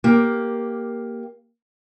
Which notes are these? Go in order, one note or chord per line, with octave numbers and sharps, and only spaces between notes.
A#3 G4